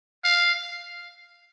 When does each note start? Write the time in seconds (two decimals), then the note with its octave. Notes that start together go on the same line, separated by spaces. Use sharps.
0.25 F5